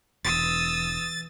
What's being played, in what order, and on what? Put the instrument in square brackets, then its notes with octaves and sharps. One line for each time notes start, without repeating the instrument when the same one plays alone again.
[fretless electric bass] E1 [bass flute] E3 [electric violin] D#6 E6 [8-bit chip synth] A6